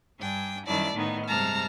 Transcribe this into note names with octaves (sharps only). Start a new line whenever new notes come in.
G2 D4 G5 G#5
F#2 D#3 G3 E4 D5 A5
A2 D#3 B3 D#4
G2 C3 G#3 A5 A#5 F6